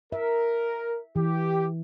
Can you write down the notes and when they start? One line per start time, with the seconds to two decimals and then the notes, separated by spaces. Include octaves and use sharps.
0.12 A#4 E5
1.16 E3 G4